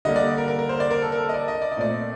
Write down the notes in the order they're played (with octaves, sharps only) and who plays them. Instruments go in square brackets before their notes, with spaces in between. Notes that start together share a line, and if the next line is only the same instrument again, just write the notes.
[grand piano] D3 G3 A#3 D#5
D5
A#4
A#4
A#4
C5
D5
A#4
A4
A#4
A4
D#5
D5
D#5
D5
D#5
A#2 A3 C4 D5